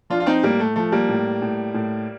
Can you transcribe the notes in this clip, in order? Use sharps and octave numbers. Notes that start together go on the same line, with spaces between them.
F3 D4 F4
F4
C4 D#4
A2 G3 A#3
A3
F3 A3
G3 A#3
A2
A2
A2